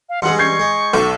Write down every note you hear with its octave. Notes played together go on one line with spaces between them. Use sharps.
F5
G2 E3 G#3 G#4 F#5 C6
C#6 G6 G#6 C7
G#3
B1 A4 D6